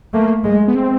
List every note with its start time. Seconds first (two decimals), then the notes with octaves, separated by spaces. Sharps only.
0.13 A3 A#3
0.44 G#3
0.68 B3
0.75 C4